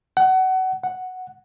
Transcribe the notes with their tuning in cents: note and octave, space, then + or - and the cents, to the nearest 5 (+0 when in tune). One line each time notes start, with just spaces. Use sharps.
F#5 +25
F#5 +0